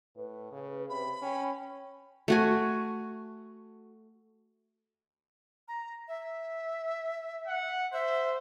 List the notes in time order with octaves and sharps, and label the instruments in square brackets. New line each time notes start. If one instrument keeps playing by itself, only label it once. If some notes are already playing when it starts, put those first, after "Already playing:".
[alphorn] A2 [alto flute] B4
[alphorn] C#3
[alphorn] C3 [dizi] B5
[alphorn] C#4 [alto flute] G5
[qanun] A3 F#4 G#5
[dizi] A#5
E5
[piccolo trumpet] F#5
[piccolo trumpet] C5 [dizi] E5